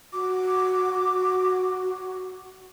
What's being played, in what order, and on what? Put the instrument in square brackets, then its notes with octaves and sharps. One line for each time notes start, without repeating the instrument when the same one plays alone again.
[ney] F#4 [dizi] D6